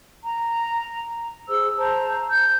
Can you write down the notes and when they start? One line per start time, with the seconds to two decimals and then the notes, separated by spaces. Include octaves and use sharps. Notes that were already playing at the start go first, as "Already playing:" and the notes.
0.23 A#5
1.48 G#4 C5 E6
1.77 C5 A5 A#5
2.30 G6